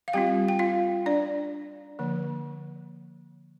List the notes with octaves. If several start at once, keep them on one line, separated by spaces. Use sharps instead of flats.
F5
G3 C4 F4 G4 G5
G5
F4 F5
D4 D5
D3 F3 A#3